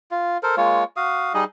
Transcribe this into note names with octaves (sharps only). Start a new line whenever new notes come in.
F4
A4 A#4 C5
G#3 A#3 F4 C#5
F#4 F5 D#6
G3 D#4 G#4 D#5